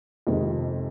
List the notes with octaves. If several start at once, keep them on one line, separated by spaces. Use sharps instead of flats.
F2 C3 D#3 G#3